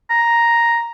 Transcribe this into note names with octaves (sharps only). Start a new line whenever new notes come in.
A#5